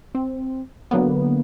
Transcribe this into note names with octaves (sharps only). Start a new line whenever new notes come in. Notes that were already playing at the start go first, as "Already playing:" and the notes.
C4
D3 F#3 A#3 B3